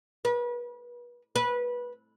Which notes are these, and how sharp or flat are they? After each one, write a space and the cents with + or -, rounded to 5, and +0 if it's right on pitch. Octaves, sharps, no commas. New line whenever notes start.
B4 -35
B4 -20